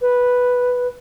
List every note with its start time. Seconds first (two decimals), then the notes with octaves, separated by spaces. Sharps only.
0.01 B4